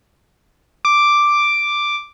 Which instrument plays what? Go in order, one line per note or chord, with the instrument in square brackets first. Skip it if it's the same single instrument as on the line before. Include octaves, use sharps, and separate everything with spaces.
[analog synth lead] D6